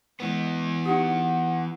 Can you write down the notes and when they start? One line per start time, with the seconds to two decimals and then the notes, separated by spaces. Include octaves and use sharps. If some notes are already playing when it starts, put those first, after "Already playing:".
0.20 E3 G#3 B3
0.86 D#4 G4 F#5